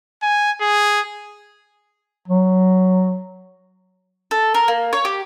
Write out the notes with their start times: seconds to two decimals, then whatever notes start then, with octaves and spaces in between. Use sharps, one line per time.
0.23 G#5
0.61 G#4
2.28 F#3
4.31 A4
4.54 A#4
4.68 A#3
4.93 C#5
5.05 G4